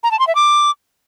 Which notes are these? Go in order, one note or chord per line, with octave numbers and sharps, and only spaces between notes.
A#5
A5
C6
E5
D6